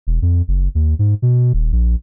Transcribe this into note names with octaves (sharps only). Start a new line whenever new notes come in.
E1
F2
F#1
D#2
G#2
B2
D#1
A#1